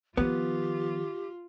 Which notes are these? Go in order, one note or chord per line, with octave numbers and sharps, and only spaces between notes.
D#3 F3 B3 F4 G4